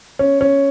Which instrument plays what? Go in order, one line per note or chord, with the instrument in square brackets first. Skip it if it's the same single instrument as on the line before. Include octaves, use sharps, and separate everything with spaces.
[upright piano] C#4
C#4